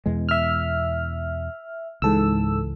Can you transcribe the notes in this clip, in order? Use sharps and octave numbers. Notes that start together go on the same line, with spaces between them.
E2 B2 G#3
E5 F6
C#2 G#2 E3 A4 E6